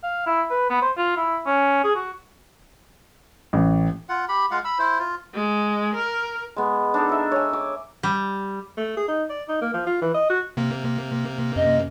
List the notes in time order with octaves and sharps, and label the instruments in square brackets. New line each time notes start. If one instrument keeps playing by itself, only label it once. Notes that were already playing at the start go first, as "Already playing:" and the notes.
[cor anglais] F5
E4
B4
B3
C5
F4
E4
C#4
G#4
F#4
[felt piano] A1
[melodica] F4 F#5
G4 B5
G#3 F4 F5 F#5
B5 E6
E4 C5
F4
[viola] G#3
A#4
[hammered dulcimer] G#3 B3
D4 D#4 A4
A#4 E5
C#5 G#5
D6
[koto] G3
[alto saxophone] A3
G#4
D#4
D5
D#4
A#3
F3
F4
E3
D#5
F#4
[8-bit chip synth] C3 A#3
[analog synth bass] F#2 [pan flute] D#5